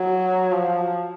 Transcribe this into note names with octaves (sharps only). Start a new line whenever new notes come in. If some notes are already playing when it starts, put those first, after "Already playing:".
Already playing: F#3
F3